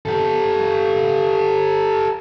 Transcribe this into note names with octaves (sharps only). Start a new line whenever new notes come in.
G4 A4